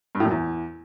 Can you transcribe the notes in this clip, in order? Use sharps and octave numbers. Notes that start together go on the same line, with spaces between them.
G2
A2
F#2
E2